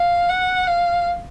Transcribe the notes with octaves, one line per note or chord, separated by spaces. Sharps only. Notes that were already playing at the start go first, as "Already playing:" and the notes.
Already playing: F5
F#5
F5